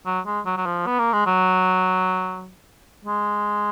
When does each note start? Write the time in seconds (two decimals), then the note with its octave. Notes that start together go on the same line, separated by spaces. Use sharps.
0.06 F#3
0.26 G#3
0.46 F#3
0.57 F#3
0.66 F3
0.87 B3
0.99 A#3
1.13 G#3
1.26 F#3
3.05 G#3